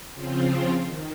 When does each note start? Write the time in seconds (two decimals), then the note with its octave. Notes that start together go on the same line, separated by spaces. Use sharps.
0.14 C#3 F3 C4 F4
0.84 D#3